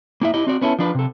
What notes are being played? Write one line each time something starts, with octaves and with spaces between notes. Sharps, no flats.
A#3 E4 E5
E4 G4 D#5
C4 F#4 D5
B3 C#4 E4 G4 A4
F3 D4 B4
C3 A4